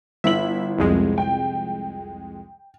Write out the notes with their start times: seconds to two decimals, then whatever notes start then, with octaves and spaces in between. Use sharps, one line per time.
0.24 G1 E4 E5 B6 F#7
0.79 C2 F2 G#3
1.18 G5